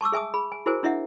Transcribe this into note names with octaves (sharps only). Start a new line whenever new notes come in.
A5 C#6 D6 E6
G#4 E5 G#5 A5 D#6
G#4 B5
G#5
E4 F#4 G#4 A#4 C5 G#5
D4 E4 D#5 E5 F#5